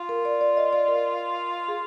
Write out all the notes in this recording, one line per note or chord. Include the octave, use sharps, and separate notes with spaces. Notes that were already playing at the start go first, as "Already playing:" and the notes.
Already playing: F4
A#4
D5
D5
D#5
D5
A#4
G#4